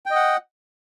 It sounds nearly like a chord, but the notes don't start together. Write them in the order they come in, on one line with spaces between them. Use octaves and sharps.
G5 D#5 F#5